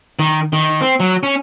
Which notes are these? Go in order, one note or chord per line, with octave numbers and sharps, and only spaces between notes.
D#3
D#3
C4
F#3
C#4